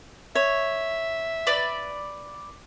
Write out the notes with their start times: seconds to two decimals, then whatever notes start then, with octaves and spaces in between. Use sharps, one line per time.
0.35 C#5 E5
1.47 B4 D5